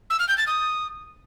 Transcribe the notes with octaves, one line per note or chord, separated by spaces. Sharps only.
E6
F6
G6
A6
D#6